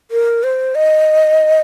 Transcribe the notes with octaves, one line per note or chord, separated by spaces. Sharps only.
A#4
C5
D#5